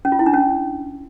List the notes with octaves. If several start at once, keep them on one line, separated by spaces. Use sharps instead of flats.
C#4
F4
E4
D4
C#4